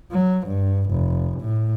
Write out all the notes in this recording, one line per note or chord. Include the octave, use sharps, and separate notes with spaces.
F#3
G2
F1
A2